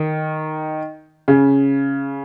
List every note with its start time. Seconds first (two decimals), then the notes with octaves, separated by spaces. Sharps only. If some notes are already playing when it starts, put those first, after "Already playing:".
Already playing: D#3
1.28 C#3